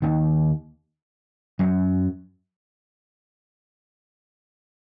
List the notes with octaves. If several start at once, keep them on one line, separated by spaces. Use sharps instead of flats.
D#2 D#3
F#2 F#3